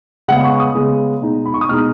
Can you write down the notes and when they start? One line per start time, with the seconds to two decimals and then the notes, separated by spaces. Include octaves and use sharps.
0.28 C#3 G#3 B3 F#5
0.44 C#6
0.60 D#6
0.75 C#3 G#3 B3
1.22 B2 G#3 D#4
1.46 B5
1.54 C#6
1.61 D#6
1.69 B2 G#3 D#4 F6